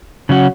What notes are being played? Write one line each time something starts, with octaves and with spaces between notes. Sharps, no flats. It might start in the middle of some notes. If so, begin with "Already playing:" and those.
C#3 F#3 C#4 F#4